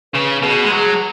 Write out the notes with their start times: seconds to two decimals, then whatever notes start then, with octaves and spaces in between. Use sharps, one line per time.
0.14 C#3 B4
0.43 B2 G#4
0.65 G#3
0.73 F#3 G#4